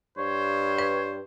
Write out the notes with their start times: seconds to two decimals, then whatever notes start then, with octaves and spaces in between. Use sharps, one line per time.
0.18 G2 C5 C#5
0.79 B4